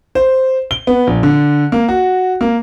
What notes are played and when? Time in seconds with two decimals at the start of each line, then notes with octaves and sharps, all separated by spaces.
0.15 C5
0.71 G7
0.87 B3
1.07 A#1
1.23 D3
1.72 A#3
1.88 F#4
2.41 A#3